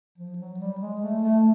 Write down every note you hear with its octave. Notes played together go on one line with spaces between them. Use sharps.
F3
F#3
G3
G#3
A3
A3